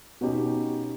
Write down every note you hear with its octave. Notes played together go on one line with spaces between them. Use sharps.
B2 C#4 D#4 G4